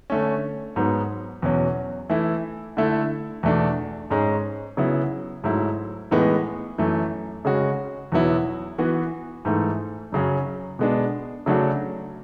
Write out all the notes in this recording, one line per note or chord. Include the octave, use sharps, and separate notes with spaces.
D3 A3 C#4
G#2 F#3 B3
E2 B2 F#3 C#4
E3 A3 E4
D3 A3 E4
E2 B2 A3 D4
G#2 G#3 C#4
C#3 F#3 B3 E4
G#2 F#3 A3 E4
A2 E3 G#3 B3
F#2 E3 A3
C#3 G#3 C#4 F#4
E2 B2 F#3 B3 E4
E3 B3 F#4
G#2 E3 A3
F#2 C#3 F#3 C#4
B2 G#3 B3 D4
C#3 F#3 A3 D4 F#4